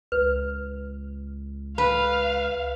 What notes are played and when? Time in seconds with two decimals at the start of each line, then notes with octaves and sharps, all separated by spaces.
0.12 C#2 B4
1.78 B4 F5